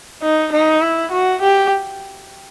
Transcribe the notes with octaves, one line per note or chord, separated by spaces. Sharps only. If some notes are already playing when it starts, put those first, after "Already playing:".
D#4
D#4
E4
F#4
G4